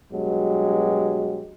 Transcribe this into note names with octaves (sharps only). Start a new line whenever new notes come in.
G2 B2 F#3 G#3 G4